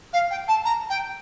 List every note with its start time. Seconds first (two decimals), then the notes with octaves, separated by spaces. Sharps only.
0.13 F5
0.31 G5
0.48 A5
0.65 A#5
0.90 G5